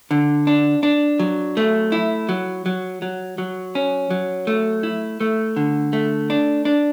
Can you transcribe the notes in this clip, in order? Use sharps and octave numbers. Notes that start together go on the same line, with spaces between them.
D3
D4
D4
F#3
A3
E4
F#3
F#3
F#3
F#3
C#4
F#3
A3
E4
A3
D3
A3
D4
D4